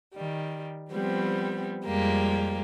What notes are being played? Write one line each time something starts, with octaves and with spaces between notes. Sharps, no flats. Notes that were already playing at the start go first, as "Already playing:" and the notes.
D#3 G3
F3 G3 B3 C4
F2 F3 G3 G#3 A#3 G4